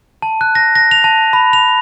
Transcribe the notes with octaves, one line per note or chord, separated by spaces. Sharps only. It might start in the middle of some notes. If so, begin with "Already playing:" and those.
A5
F#6
A#6
A#6
F7
A5
B5
F7